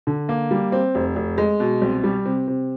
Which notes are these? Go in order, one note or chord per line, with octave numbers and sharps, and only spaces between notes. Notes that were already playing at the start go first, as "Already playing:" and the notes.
D3
A#3
G3
C4
F1
F1
G#3
B2
C2
G3
C3
C3